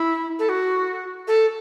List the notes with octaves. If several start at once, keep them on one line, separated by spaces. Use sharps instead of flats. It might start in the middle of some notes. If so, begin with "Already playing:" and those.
Already playing: E4
A4
F#4
A4